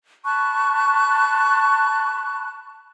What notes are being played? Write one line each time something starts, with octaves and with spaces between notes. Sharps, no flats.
A5 B5 C#6 F#6